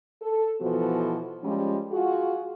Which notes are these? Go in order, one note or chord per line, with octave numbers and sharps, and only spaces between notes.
A4
B2 E3 F3 B3 F#4 A4
F3 G3 G#3 C#4
F4 F#4 G#4